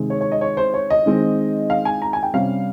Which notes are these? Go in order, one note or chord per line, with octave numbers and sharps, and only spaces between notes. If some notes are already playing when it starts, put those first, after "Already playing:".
Already playing: C3 D#3 G#3
C#5
C#5
D#5
C#5
C5
C#5
D#5
D#3 G#3 C4
F5
G#5
A#5
G#5
G5
C3 G3 C#4 F5